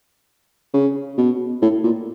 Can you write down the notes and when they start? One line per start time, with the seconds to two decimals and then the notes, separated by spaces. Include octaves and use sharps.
0.74 C#3
1.18 B2
1.62 A2
1.84 A#2